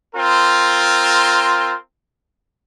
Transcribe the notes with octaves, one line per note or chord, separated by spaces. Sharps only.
C4 F4 A#4